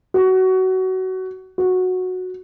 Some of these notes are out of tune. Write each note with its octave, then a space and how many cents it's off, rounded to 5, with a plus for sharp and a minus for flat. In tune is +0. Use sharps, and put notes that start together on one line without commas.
F#4 +20
F#4 -10